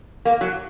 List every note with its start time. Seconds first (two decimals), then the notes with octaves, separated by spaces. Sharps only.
0.25 A#3
0.41 F#3